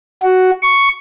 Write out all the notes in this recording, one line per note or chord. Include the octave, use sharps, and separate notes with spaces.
F#4
C#6